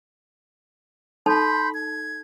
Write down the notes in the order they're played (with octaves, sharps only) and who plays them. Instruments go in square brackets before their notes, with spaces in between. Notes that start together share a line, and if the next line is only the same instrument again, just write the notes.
[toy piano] D#4 A4 A5 [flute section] B5 C6 G6
[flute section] G#6